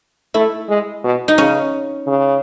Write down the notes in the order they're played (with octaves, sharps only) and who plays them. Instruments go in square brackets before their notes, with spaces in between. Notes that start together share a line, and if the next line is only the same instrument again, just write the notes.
[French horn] A3 [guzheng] E4
[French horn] G#3
B2
[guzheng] D#4
[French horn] C#3 [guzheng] C#4
[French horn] C#3